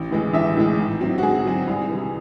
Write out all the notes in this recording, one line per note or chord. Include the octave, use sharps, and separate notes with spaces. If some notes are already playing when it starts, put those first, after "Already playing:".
Already playing: A1
A2 E3 G#3
A1 E5
A2 E3 G#3
G#2
F#3 C4
F#4
G#2 G#4
F#3 C4
C2
C3 E3